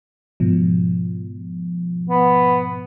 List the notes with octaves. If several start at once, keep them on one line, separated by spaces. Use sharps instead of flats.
G#2 B2 F3
B3